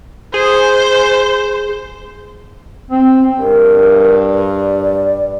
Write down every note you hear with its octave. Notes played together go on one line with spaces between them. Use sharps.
G#4 C5
C4
G2 A#4
D5